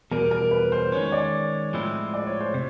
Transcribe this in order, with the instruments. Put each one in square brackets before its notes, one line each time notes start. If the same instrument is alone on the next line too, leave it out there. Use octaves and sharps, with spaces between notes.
[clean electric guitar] E2 B2 G3 [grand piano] A#4
[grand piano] A#4
B4
C5
[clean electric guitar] D#3 G#3 C#4 [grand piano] C#5
[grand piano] D5
[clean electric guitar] A2 F3 G#3 C4 E4
[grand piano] D5
C#5
C5
[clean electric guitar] C3 [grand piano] C#5